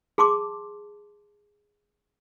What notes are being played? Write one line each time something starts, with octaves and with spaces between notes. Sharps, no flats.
G#4 A5 C6 D6